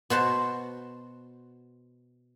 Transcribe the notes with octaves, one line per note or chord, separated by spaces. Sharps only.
B2 F#4 C5 A5